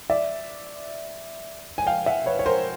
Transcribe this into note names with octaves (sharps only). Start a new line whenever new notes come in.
D5 E5
G#5
F5 G5
E5 F#5
B4 C#5
C#5
A#4 C5